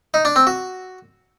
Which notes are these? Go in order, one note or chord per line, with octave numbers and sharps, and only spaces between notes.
D#4
D4
C4
F#4